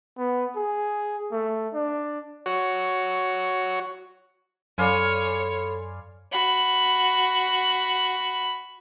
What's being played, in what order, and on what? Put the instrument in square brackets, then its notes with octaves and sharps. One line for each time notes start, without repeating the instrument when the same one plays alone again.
[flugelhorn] B3
G#4
A3
D4
[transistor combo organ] F#4 C#5
[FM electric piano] F#2 [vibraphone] A4 B5 C6 [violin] C#5 [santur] D5 F5 G#5
[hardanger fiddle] F#4 B5